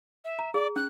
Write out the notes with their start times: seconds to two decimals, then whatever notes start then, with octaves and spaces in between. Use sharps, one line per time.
0.25 E5
0.39 A#5
0.54 G#4 D5
0.76 C#4 F#6